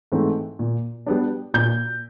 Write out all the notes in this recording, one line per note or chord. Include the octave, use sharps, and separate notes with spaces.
G#2 E3 A3 C4
A#2
G3 B3 D4
A#2 G6